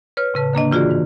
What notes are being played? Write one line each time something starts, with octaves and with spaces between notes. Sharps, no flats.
B4 C#5 F6
A2 C#3 B4 A5
D3 A#3 D4 D#5
E3 F4 F#4 G#4 D5
G#2 D#3